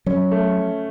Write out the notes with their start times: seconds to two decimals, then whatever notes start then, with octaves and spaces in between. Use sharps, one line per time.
0.06 F#3 C#4
0.31 A3